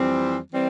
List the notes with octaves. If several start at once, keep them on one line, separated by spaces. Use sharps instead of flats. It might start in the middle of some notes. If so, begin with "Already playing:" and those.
Already playing: F2 E3 G3 C4
E3 G3 C4